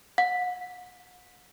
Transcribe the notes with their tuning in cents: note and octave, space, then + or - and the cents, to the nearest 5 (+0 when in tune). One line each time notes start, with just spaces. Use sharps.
F#5 -40